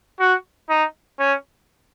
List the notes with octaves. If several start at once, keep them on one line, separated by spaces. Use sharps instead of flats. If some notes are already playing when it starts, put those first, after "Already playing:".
F#4
D#4
C#4